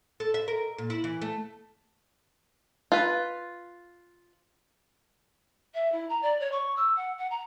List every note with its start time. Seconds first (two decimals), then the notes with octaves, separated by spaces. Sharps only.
0.20 A4
0.34 E5
0.48 A#4
0.78 A#2
0.90 E4
1.04 E3
1.22 A3
2.92 F4 B4
5.74 E5
5.92 E4
6.09 A#5
6.22 D5
6.40 C#5
6.51 C#6
6.76 E6
6.96 F#5
7.18 F#5
7.31 A#5